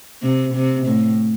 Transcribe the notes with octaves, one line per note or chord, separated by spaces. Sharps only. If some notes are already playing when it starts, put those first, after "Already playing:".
C3
C3
A2